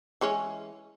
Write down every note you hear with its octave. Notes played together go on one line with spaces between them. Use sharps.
E3 G#3 C#4